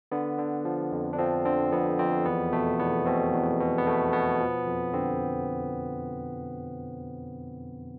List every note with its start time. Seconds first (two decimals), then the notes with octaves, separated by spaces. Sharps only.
0.12 D3 B3
0.38 D3
0.65 F3
0.92 F2
1.13 D4
1.18 F3 C4
1.45 D3 C4
1.72 F2 B3
1.99 F2 C4
2.26 E2 B3
2.53 B2 A3
2.79 E2 B3
3.06 B2 C4
3.33 E2
3.60 B2
3.78 B3
3.86 B2 A3
4.13 B2 B3
4.40 F3
4.67 F2
4.93 D3 C4